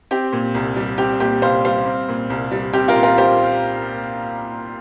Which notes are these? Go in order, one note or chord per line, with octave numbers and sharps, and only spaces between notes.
C4 G4
A#2
C2
G3
C4 G4
A#2 G4
C2 C5 F5
G3 C5 F5
C4
A#2
C2
G3
C4 G4
F4 A#4
A#2
F4 A#4
G4 C5